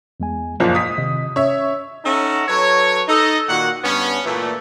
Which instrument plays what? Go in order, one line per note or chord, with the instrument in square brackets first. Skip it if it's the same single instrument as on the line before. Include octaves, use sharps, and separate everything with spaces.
[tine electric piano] E2 G#3 G#5
[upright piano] F#1 A#2 F3 [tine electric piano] D#5
[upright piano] D#6 B6
[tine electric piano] C3 D#3 D#5
[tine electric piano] C#4 [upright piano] C#5 E5
[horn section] C#4 D#4 A4 E5 F#5 A#5
F#3 A4 B4 C#5
D#4 A4 D#5
A#2 D#3 F#4 F#5
G2 B3 C#4
A#2 E3 A3